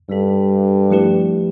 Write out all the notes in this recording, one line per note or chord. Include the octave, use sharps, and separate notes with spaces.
G2 G3 D4 A4
F3 A3 E4 G4 B4